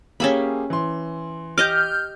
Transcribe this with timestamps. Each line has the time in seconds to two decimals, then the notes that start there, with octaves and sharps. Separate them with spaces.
0.20 A#3 C#4 G4 G#4 E5 B5
0.70 E3 C6
1.58 G4 D#5 D6 F6 G6